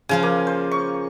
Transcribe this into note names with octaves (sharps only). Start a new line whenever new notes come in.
C#3 F3 F4 G#5
A#3
C5
C#6